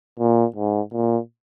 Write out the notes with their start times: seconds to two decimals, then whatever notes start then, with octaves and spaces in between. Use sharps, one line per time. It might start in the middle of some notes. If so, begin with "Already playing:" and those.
0.19 A#2
0.56 G#2
0.93 A#2